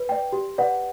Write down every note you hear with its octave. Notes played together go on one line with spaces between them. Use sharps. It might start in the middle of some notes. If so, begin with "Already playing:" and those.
Already playing: B4
D5 G5
G4
B4 D5 F#5